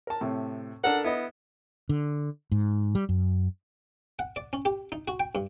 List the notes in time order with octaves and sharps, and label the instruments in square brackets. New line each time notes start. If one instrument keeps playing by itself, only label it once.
[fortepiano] A#4 A5
A2 C3
[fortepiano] D4 A4 A#4 [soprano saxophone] F#5
[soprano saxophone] B3 [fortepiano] E4 D#5
[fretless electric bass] D3
G#2
G3
F#2
[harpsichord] F#5
D5
C#4
G4
D#4
F#4
G5
G2